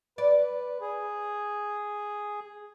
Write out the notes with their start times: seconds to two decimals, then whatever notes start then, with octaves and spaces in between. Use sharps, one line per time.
0.18 B4 D5
0.81 G#4